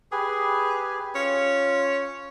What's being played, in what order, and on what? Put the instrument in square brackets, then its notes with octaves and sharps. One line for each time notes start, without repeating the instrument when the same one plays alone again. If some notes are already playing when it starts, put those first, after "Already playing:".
[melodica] G4 B4 G#5 [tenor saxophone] G#4
[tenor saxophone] C#4 [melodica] F4